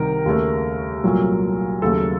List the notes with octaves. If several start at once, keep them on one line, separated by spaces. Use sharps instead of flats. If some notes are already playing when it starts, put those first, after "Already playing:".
Already playing: C2 C3 D#3 A#4
D#2 C#3 A3
C2 A#2 F#3 A3
D#2 C#3 F#3 A3 A4